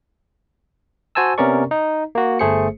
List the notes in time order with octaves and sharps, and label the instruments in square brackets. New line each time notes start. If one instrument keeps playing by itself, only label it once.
[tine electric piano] F#4 C5 G#5 A5 E6
C3 B3 C#4 A#4 D5 C#6
D#4
A#3 F#4
G1 A3 G#4 C5 C#7